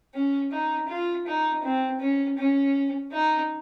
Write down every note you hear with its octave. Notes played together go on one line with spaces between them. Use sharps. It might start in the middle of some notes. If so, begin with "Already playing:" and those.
C#4
D#4
F4
D#4
C4
C#4
C#4
D#4